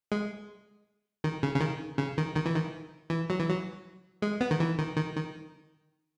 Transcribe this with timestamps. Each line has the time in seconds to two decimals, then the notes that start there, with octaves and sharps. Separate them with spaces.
0.12 G#3
1.24 D#3
1.43 C#3
1.55 C#3
1.61 D#3
1.98 C#3
2.18 D#3
2.36 D#3
2.46 E3
2.56 D#3
3.10 E3
3.30 F#3
3.39 E3
3.49 F#3
4.22 G#3
4.41 B3
4.51 D#3
4.60 E3
4.79 D#3
4.97 D#3
5.16 D#3